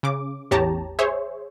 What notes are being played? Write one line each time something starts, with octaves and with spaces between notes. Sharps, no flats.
C#3 D6
A1 E2 G4 C#5 A5 A#5
G#4 C5 C#5 E5